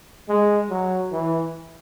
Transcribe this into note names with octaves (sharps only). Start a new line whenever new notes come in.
G#3
F#3
E3